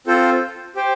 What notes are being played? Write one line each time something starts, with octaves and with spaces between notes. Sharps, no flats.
C4 F4 A4 C5
G4 C5 G5